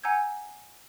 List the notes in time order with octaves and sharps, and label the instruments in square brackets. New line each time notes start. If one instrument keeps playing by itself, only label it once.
[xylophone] F#5 G#5 A#5 E6 G6 G#6